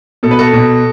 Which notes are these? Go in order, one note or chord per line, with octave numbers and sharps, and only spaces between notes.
B2 A4
B4
F#4 A4
B2